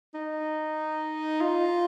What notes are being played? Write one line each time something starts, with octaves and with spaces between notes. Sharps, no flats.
D#4
F4